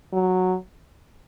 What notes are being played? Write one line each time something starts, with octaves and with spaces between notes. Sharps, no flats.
F#3